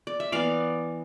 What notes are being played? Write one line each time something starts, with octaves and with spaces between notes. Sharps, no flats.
D5
E5
E3 B3 D5 F5